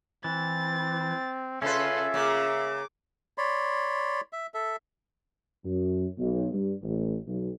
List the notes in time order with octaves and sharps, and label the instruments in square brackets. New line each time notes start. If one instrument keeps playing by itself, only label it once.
[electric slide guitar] E3 [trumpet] C4 [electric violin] A6
[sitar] C#3 B4 [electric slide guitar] C#4 F4 [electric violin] A4 C6 [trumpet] E5
[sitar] C#3 A#3 [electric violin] D6
[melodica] C#5 D5 B5 C6
E5
A4 E5
[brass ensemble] F#2
B1
G2
A1
B1